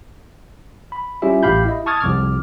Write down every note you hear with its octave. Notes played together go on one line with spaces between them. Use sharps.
B5
G3 C#4 E4 F4 G4 E5
A1 A2 G4 F5 B5 G6
E4 D#5
A5 C#6 D#6 F6 G#6 A6
C2 F2 D6 F6